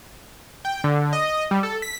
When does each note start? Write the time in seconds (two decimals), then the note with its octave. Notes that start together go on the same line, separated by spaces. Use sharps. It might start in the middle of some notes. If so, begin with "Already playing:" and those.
0.65 G5
0.84 D3
1.13 D#5
1.51 G3
1.63 A4
1.82 B6